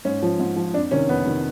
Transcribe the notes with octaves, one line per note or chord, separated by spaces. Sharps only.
G#2 C#4
F3
G#2
F3
F2 D4
C3 D#3 C#4
F2 B3
C3 D#3